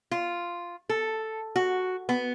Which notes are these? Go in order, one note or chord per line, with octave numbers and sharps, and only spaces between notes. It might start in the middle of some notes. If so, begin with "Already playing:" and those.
F4
A4
F#4
B3